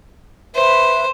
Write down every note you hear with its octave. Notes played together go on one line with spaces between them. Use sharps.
B4 C5 E5